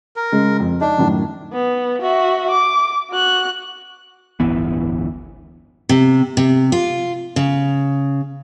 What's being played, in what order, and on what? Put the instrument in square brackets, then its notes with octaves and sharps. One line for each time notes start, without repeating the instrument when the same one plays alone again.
[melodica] A#4
[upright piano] C#3 G#3
F2
[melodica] D4 [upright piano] D#4
[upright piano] F#2 A2 D#3
[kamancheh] B3
F#4 E5
D6
F#4 F#6
[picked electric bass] D1 G1 E3 B3
[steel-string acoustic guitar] C3
C3
F4
C#3